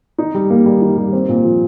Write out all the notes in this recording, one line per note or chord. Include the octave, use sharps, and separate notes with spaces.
D#4
G3
A#3
G3
D#4
G3
C4
A#2
F3